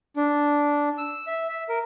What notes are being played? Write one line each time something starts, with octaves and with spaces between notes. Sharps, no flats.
D4
E6
E5
E5
A#4